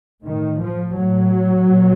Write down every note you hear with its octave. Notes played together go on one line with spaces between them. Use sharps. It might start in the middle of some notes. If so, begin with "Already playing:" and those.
A2 D#3
F3
A2 F#3
A#2